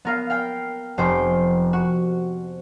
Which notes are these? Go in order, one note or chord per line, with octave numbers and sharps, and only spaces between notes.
B3 A#4 F5
F5 G5
F1 C5 G5
F#4